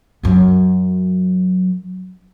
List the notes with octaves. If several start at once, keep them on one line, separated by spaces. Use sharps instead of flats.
F#2 F#3